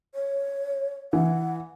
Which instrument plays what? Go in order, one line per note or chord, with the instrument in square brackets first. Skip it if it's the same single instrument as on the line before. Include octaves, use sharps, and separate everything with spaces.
[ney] C#5
[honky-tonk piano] E3 [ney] F#5